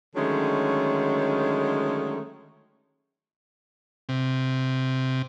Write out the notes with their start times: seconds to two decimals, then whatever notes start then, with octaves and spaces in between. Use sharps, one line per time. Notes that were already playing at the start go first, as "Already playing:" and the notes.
0.15 D3 D#3 F#3 G#3 A3 C#4
4.09 C3